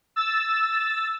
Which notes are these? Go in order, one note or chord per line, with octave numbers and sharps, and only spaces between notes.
E6 A6